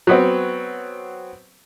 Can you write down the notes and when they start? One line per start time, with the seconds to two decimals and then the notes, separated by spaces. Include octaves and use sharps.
0.07 F#3 B3 C4